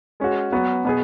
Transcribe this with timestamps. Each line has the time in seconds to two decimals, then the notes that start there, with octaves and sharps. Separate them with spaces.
0.20 G#3 C#4 F#4
0.52 F#3 B3 F#4
0.85 B2 B3 G#4